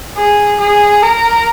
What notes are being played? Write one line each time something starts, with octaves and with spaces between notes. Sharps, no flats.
G#4
G#4
A#4